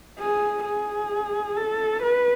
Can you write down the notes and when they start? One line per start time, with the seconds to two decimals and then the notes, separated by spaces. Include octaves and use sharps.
0.19 G#4
0.65 G#4
1.57 A4
2.02 B4